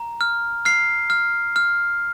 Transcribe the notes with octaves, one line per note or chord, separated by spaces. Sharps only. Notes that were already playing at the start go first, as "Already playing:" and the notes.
Already playing: A#5
F6
F6 C7
F6
F6